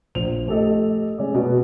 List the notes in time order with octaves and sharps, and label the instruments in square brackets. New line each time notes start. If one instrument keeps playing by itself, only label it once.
[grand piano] A#1 C5 F7
A3 G4 A4 D#5
G#3 C#4 D5
B2 B3